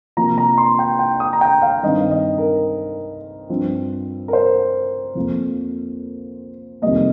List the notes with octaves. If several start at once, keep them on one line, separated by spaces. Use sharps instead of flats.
C3 F3 A#3 A#5
A#5
C6
G5
G5
D#6
A#5
G5
F5
G2 D#3 C4 D#5
D#5
A#4
G2 F3 C4
A#4
C5
F2 F3 A#3
F2 C3 D#3 G3 A#3 D#5